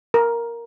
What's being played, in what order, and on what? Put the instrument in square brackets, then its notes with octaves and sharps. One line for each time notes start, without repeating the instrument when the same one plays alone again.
[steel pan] A#4